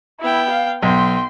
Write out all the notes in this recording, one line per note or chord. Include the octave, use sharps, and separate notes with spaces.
B3 E4 G5
F5
B1 G5 C6